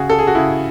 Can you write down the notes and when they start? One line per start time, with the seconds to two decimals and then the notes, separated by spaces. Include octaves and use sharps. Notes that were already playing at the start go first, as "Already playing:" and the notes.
Already playing: C#3 F#4 G#4
0.10 A4
0.19 G#4
0.27 F#4
0.35 C#3 E4